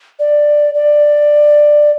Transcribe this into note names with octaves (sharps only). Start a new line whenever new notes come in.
D5
D5